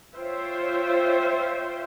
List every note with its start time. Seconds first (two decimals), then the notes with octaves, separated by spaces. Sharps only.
0.16 F4 C5 C#5 E5 G5